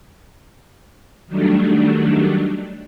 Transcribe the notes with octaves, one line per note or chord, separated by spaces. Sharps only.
D#3 F#3 G3 A3 D4